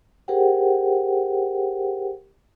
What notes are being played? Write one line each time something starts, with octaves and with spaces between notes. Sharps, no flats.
G4 G#4 A#4 C5 F#5 G5